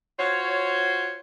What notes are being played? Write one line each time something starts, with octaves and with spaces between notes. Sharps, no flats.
F4 F#4 C5 C#5